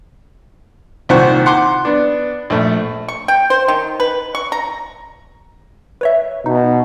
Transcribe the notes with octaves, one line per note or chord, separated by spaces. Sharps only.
C2 A#2 D#3 C5 F#5 C#6
F#5 C6 D6
B3 D4
A#1 A3
C#6
G5
C5
D#3
B4
C#6
A#5
B4 C#5 E5
B2 D#4